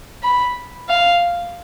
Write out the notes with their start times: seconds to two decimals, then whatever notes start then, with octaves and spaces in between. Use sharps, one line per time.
0.23 B5
0.89 F5